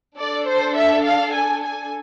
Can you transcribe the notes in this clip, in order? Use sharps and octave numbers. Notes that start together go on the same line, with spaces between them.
D4 A4 D5
C5
E5
F5
G#5
G#5